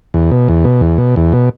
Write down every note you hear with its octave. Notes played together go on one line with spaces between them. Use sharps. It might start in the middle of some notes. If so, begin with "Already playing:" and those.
E2
B2
E2
B2
E2
B2
E2
B2